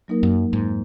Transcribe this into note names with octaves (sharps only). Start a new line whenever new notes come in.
F#3 A#3 D#4 A#4
F#2
F2 G#2